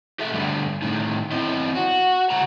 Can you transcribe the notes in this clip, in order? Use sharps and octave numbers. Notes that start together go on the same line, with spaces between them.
G4 A4 E5
G2 D3 G3 A3
A2 D#3
E2 C4 E4 D#5
F#4
C#3 F#5 A#5